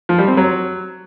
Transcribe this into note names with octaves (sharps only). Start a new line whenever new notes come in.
F3
G3
C4
F#3